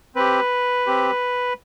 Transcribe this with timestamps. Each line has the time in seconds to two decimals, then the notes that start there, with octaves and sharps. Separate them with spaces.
0.15 C4 G4 B4
0.87 C4 G4